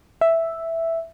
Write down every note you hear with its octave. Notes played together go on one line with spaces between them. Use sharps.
E5